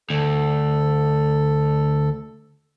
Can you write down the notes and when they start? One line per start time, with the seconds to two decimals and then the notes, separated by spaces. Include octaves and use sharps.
0.10 D2 A4